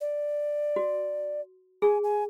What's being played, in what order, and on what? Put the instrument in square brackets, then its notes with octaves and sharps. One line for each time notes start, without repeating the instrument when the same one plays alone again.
[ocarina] D5
[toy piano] F#4
[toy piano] G#4 [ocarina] G#5
[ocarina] G#5